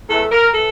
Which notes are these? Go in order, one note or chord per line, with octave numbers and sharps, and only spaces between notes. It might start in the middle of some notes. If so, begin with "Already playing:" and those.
E2 E3 A3 A4
A#4
E3 A4